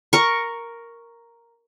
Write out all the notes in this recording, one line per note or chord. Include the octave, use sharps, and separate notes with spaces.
A#4 C#6